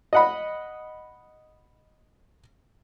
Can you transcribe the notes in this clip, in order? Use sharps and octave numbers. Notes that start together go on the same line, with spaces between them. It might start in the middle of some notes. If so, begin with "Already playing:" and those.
D#5 F#5 B5